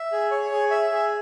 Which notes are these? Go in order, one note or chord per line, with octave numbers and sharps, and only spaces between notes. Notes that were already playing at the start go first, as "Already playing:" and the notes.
Already playing: E5
G#4
C#5
G#4
E5
G#4